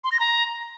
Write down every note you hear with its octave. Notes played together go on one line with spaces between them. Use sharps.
C6
A#6
A#5